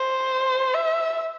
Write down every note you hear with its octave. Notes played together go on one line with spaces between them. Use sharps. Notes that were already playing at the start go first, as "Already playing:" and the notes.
Already playing: C5
E5